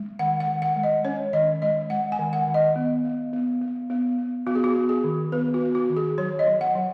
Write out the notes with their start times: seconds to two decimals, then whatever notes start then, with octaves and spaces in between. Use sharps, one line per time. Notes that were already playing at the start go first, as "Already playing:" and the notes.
Already playing: G#3
0.19 D#3 F#5
0.40 F#5
0.48 D#3
0.62 F#5
0.76 G#3
0.83 D#5
1.05 C#4 C#5
1.33 D#3 D#5
1.62 G#3 D#5
1.90 G#3 F#5
2.12 G#5
2.19 D#3
2.33 F#5
2.47 D#3
2.54 D#5
2.76 B3
3.04 B3
3.33 B3
3.61 B3
3.90 B3
4.18 B3
4.47 B3 F#4
4.55 G#4
4.64 F#4
4.75 B3
4.89 G#4
5.04 D#3
5.32 B3 B4
5.54 F#4
5.61 B3
5.75 F#4
5.90 D#3
5.97 G#4
6.18 F#3 C#5
6.39 D#5
6.47 F#3
6.61 F#5
6.75 F#3